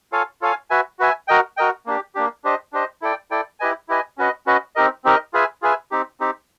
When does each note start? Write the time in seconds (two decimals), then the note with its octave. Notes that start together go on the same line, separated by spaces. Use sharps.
0.12 F4 A4 C#5 F5 G#5
0.41 F4 A4 C#5 F5 G#5
0.70 F#4 B4 E5 G#5
0.99 F#4 B4 E5 G#5
1.28 F#4 A#4 D#5 G5
1.57 F#4 A#4 D#5 G5
1.86 A#3 D4 G4
2.15 A#3 D4 G4
2.44 D4 G4 C5 D#5
2.73 D4 G4 C5 D#5
3.02 E4 A4 D5 G5
3.31 E4 A4 D5 G5
3.60 E4 G4 B4 D#5 G#5
3.89 E4 G4 B4 D#5 G#5
4.18 C#4 F#4 B4 D#5
4.46 C#4 F#4 B4 D#5
4.76 C4 D#4 G4 A#4 D#5
5.04 C4 D#4 G4 A#4 D#5
5.34 F4 G#4 B4 E5 G#5
5.62 F4 G#4 B4 E5 G#5
5.91 C4 D#4 G4
6.20 C4 D#4 G4